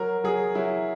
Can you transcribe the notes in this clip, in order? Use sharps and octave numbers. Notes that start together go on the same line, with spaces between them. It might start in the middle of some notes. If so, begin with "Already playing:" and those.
Already playing: F#3 A#4
F#3 G#4
F#3 E4